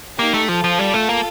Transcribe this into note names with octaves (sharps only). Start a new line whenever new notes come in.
A#3 D#4 G4
A3
F3 F4 A4
F3
G3
A3
A#3